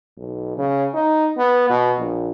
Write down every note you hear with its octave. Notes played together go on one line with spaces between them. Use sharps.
B1
C#3
D#4
B3
B2
A#1